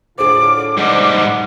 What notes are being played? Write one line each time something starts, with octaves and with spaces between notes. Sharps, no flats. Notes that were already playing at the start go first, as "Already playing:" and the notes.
A2 D3 F4 G#4 C5 D6
G#2 G3 D5 F#5 D6